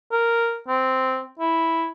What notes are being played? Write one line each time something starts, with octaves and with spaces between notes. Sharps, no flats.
A#4
C4
E4